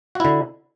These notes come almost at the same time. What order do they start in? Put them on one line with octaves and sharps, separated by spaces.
F#4 E4 D3